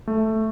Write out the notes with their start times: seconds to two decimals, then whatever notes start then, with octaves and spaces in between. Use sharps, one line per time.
0.07 A3